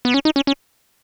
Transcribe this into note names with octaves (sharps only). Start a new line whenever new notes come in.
B3
C#4
D#4
C#4
C#4